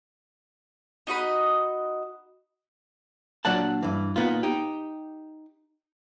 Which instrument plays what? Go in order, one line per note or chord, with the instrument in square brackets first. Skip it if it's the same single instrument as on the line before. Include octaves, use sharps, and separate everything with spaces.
[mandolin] D#4 F#4 D#5 B5
[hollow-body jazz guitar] A#2 F#3 D4 D5 F#5 A5
G2 E3
A#2 B3 D#4 F4
D#4 G4